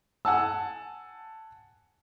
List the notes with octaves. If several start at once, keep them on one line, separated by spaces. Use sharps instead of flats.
F#5 G#5 A5 E6